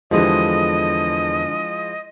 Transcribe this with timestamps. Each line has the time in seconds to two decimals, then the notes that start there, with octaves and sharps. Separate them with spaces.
0.11 E2 D3 F3 G#3 E4 G4 D#5